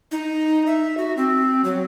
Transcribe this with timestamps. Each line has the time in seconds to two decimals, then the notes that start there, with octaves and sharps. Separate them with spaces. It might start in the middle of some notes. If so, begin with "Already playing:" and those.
0.12 D#4
0.67 E5
0.97 F#4
1.17 C4
1.64 F#3